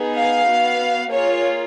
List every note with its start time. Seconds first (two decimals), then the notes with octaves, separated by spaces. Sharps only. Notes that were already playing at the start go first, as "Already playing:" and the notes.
Already playing: B3 D#4 G#4
0.16 F5
0.48 B3 F#4
1.11 A#3 F4 G#4 C#5